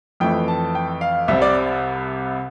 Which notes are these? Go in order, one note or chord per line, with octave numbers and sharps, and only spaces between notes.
F2 E3 A3 E4 G5
A5
G5
F5
C2 C3 G3 C4 E5
D5